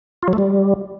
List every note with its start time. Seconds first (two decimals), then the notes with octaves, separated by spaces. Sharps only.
0.23 F4
0.28 F#3
0.33 A3
0.38 G3